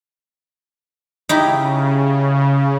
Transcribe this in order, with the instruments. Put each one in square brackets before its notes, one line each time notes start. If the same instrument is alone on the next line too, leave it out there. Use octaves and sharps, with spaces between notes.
[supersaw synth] C#3 [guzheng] D#4 E4 G4